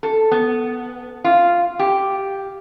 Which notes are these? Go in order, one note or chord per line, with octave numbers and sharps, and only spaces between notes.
A4
B3
F4
G4